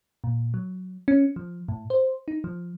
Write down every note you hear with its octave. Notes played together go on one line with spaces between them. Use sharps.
A#2
F#3
C#4
F3
A2
C5
D#4
F3